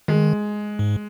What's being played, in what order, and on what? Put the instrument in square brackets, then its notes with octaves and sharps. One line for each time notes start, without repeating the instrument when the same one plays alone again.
[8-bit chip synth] D#3 [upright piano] G#3
[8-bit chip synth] G#2